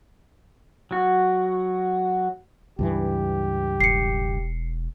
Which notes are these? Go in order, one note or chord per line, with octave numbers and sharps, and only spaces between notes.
F#3 F#4
C#2 G2 E3 G4
E1 C7 C#7